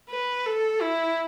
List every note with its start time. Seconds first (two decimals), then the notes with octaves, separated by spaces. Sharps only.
0.09 B4
0.46 A4
0.81 E4